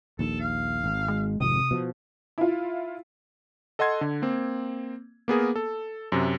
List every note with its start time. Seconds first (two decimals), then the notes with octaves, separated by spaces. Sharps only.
0.19 A#1 D#2 A4
0.40 F5
0.84 G#1
1.08 G#3
1.40 G#1 F2 C3 D#6
1.71 B2 F3
2.38 E4 F4
3.79 A4 D#5 F#5 C6 G#6
4.01 D3
4.22 A#3 C4
5.28 A#3 B3 G#4 A#4
5.56 A4
6.12 F#2 C3